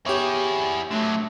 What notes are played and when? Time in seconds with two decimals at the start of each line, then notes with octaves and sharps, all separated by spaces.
0.06 E4 G4 G#4 C#5
0.91 D3 F#3 A3